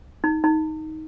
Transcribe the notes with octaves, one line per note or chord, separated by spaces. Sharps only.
D#4
D#4